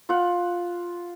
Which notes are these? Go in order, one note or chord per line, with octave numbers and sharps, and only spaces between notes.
F4 F#5